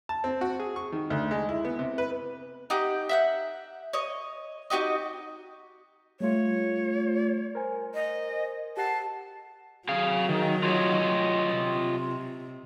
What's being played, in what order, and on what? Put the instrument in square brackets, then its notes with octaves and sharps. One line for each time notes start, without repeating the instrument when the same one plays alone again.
[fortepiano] A5
C4
F#4
G#4
C#6
D#3
D2
G#3
E4
B3
C3
B4
[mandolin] D#4 G4 F#5
E5 F#5 G6
C#5 D#5
D#4 F#4 G4 D#5
[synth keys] G3 A3 F4 [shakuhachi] C#5
[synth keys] A#4 C5 G#5
[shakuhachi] D#5
[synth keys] G4 F#5 C7 [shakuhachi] A5
[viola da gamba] F#3 [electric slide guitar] G#4 F5
[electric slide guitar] D#3
F4 C#5 D#5
[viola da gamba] C3